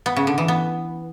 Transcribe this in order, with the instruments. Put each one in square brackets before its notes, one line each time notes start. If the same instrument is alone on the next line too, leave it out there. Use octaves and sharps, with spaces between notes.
[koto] B3
C#3
D3
E3
B3